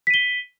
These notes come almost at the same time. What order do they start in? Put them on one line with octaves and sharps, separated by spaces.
B6 D#7 G7